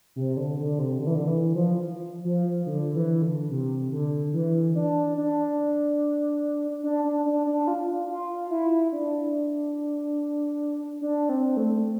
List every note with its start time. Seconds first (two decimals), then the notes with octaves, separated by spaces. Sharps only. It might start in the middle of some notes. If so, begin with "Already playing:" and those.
0.16 C3
0.37 D3
0.58 D3
0.79 C3
1.00 D3
1.07 E3
1.15 D3
1.27 E3
1.55 F3
2.25 F3
2.66 D3
2.95 E3
3.22 D3
3.50 C3
3.92 D3
4.34 E3
4.75 D4
5.17 D4
6.84 D4
7.05 D4
7.26 D4
7.47 D4
7.67 F4
8.09 F4
8.51 E4
8.92 D4
11.01 D4
11.29 C4
11.57 A3